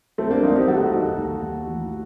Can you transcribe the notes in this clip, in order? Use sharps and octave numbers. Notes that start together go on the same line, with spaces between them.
C2 A3 C4
A#3 D4
C2 C4 D#4
D#4 G4
D#2 F#4 A4
D#2
D#2
D#2
A1